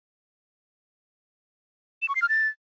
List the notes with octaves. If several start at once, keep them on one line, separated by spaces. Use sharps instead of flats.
E7
C#6
C7
F6
A6